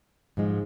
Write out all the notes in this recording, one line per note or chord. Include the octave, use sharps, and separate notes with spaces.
G#2 F3 G#3